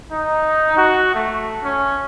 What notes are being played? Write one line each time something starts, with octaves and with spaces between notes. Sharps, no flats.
D#4
F#4
A3
C#4